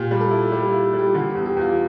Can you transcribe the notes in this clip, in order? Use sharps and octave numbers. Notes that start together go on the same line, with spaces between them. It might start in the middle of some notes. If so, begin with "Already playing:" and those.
Already playing: A#2 G4
G3
A4
E4
G3 G4
E4 F4
G4
G3
G4
F4
D3 G4
E2 G4
G4
E2 F4